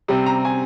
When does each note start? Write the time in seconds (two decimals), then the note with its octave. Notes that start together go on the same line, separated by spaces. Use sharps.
0.08 C3 G3 C4
0.26 A#5
0.45 G#5